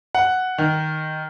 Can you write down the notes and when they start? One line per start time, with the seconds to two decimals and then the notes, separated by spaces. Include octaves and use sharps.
0.15 F#5
0.58 D#3